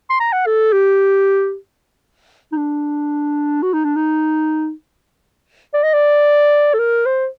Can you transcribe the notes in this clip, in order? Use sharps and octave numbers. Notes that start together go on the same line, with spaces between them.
C6
A#5
F#5
A4
G4
D#4
D4
F#4
D#4
D4
D#4
D5
D#5
D5
A4
A#4
C5